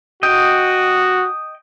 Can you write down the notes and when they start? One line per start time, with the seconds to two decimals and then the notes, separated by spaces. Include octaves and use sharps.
0.23 F#4 D#5 G5